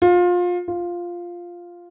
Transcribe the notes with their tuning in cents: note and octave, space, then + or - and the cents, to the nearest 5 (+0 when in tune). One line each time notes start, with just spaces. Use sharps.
F4 +25
F4 +0